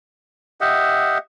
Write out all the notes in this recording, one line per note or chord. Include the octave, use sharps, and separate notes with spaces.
G4 D#5 E5 F#5